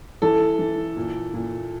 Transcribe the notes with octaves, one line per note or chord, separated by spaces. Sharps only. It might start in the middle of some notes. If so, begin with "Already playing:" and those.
E3 A4
E3
A#2
A#2